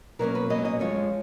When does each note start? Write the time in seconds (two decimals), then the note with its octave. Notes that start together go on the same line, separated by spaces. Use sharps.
0.19 B2 F#3 A#3 C#4 A#4
0.35 B4
0.50 B2 F#3 A#3 C#4 D#5
0.65 D#5
0.80 F2 F3 G#3 C#5